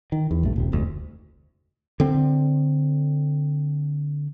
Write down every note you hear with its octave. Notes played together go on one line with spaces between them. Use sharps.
D#3
E2
A#1 G2 A3
D#1 C2 C3
F1 D2 G#2
D3 C4